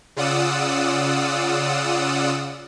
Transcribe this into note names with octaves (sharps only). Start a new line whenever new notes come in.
C#3 F4 D5 F#5 D#6 E6